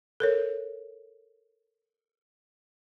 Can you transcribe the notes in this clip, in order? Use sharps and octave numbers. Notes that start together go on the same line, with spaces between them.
A4 A#4 C#5